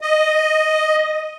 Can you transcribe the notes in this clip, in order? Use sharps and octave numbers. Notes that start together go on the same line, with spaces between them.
D#5